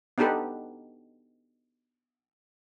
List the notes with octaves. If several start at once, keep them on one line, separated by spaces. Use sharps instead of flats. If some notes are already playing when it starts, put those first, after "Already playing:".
B3 D4 D#4 G4 A4 B4